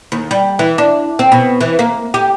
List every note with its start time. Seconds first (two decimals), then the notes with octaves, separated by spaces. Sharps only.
0.12 D#2
0.31 G3
0.59 E3
0.78 D4
1.19 C4
1.32 B2
1.61 E3
1.79 A#3
2.14 G4